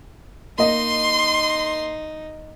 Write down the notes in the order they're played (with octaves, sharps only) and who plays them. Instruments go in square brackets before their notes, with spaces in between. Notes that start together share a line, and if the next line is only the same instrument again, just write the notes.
[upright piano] A#3 D#5 [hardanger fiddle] D#4 [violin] C6